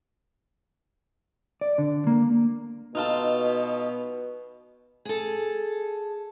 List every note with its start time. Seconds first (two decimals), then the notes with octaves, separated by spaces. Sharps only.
1.61 D5
1.78 D3
2.07 A#3
2.95 B2 D#4 F4 A4
5.05 G#4 A4